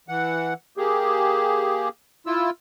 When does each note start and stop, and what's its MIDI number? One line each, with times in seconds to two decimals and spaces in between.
0.08 0.54 52
0.08 0.54 78
0.77 1.89 58
0.77 1.89 67
0.77 1.89 68
2.27 2.50 64
2.27 2.50 65
2.27 2.50 88